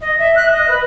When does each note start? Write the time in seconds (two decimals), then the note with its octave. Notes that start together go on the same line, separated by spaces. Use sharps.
0.01 D#5
0.18 E5
0.35 F#6
0.50 D#5
0.68 B4